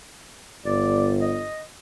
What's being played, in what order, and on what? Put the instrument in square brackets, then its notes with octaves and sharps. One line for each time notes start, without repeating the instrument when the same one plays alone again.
[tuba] G1 [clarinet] D5
[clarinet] D#5